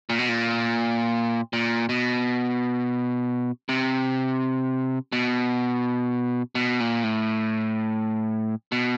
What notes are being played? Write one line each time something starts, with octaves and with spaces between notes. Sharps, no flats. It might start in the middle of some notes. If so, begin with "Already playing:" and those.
A#2
B2
A#2
A#2
B2
C3
B2
B2
A#2
A2
B2